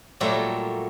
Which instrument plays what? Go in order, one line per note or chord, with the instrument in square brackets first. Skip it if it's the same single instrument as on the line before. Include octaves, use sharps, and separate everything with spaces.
[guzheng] A#2 F#3 G3 A3 E5